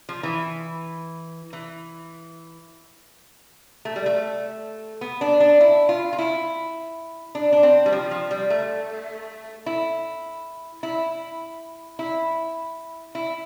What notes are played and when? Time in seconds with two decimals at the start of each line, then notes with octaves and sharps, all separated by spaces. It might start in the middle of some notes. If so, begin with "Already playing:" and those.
0.09 F3
0.23 E3
1.53 E3
3.85 A3
3.96 G3
4.06 A3
5.01 B3
5.21 D4
5.40 D4
5.61 E4
5.89 F4
6.13 F4
6.19 E4
7.35 D4
7.52 D4
7.63 C4
7.86 G3
7.92 F3
8.11 F3
8.31 G3
8.50 A3
9.66 E4
10.83 E4
11.99 E4
13.15 E4